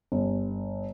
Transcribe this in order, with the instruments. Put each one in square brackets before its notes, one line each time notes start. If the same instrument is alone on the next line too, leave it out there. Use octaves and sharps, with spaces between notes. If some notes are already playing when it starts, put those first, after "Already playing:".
[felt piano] G1